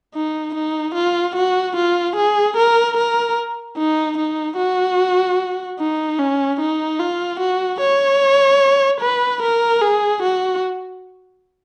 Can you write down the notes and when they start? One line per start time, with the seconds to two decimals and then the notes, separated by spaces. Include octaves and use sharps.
0.15 D#4
0.55 D#4
0.95 F4
1.35 F#4
1.76 F4
2.16 G#4
2.57 A#4
2.97 A#4
3.78 D#4
4.18 D#4
4.58 F#4
5.80 D#4
6.19 C#4
6.60 D#4
6.99 F4
7.40 F#4
7.81 C#5
9.01 B4
9.42 A#4
9.81 G#4
10.23 F#4